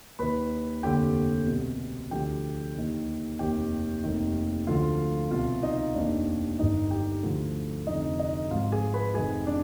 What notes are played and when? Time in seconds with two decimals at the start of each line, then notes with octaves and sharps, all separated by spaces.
0.19 D#2 D#3 B4 B5
0.83 F1 D#2 D3 G4 G5
1.47 C2 B2
2.11 D2 D3 F3 G4 G5
2.75 D#2 D#3
3.39 F1 D#2 D#3 G4 G5
4.04 F1 D#2 D#3
4.67 D2 D3 F3 F4 F5
5.31 C2 B2 F4 F5
5.63 D#4 D#5
5.95 F1 D#2 D#3 D4 D5
6.59 G1 G2 D#3 D#4 D#5
6.91 G4 G5
7.23 D2 D3 F3
7.87 F1 F2 D3 F3 D#4 D#5
8.19 D#4 D#5
8.51 G#1 G#2 F3 F4 F5
8.72 G#4 G#5
8.94 B4 B5
9.14 F1 F2 D#3 G#4 G#5
9.46 D4 D5